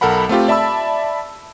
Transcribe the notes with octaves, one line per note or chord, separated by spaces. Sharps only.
B1 A4 A#4 F#5 B5
A3 C4 F4 G4
D5 E5 A5 B5 E6